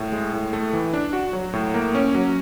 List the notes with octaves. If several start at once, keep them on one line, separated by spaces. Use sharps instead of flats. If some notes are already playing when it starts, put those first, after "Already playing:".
Already playing: A2
G#3
A2
A3
E3
D4
F#4
F#3
A2
A#3
C#4
F#3